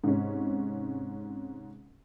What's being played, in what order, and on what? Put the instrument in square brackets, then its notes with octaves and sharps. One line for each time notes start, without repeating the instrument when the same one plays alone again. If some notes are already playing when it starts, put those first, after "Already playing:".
[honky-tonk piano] G#2 C3 C#4